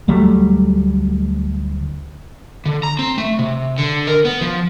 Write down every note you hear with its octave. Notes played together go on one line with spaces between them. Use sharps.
D2 F#3 G3 A3
D3
A#5
C4
A3
C3
D3
A#4
B3
F3